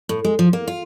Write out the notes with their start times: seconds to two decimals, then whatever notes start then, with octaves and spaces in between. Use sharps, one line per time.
0.09 A2
0.24 G#3
0.39 F3
0.53 A#3
0.67 F4